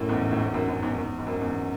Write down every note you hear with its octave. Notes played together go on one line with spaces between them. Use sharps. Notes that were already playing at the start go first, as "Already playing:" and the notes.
Already playing: F#2 A2
E2 G#2
A2
E2 G#2
F#2
F#2
E2 G#2
E2
G#2
F#2
E2